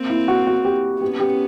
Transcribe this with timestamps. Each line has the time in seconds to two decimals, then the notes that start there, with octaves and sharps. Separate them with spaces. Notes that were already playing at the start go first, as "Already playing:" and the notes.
Already playing: A#3 C4
0.10 E4
0.28 F#4
0.47 F#4
0.65 G4
1.01 B3 C#4 G4
1.20 G4